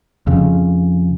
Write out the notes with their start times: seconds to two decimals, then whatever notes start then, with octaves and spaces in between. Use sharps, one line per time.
0.27 F2 C#3